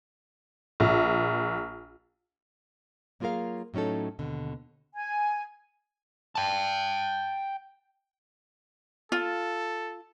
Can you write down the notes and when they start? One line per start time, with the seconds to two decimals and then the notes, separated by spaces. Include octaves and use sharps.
0.80 A#1
3.20 F#3 A#3 F4 G#4 A#4 F5
3.74 A2 F#3 C#4 D#4 A4
4.19 D#2 B2 D3
4.94 G#5
6.35 G5 A5
9.12 F4 A4